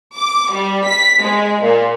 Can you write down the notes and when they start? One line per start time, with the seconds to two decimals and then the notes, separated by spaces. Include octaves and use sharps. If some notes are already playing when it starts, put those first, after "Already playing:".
0.17 D6
0.53 G3
0.87 B6
1.23 G#3
1.62 A#2